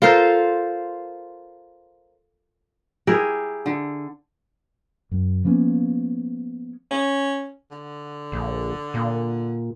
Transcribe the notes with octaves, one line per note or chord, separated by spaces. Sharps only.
F4 A4 A#4 C5
E4 G4 G#4 A#4
D3
F#2
F3 A#3 B3 C#4
C#4
D3
A#1
A#2